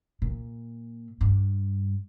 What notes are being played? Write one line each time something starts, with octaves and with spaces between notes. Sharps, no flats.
A#2
G2